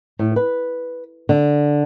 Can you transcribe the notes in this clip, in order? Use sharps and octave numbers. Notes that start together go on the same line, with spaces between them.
A2
B4
D3